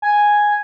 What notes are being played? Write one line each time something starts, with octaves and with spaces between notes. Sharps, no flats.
G#5